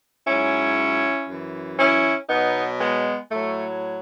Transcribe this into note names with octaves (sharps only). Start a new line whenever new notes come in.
G#2 F#3 C#4 E4
F#2 E3
C#4 E4
B2 F#3 B3 D#4
G#3 B3
A2 F#3 A3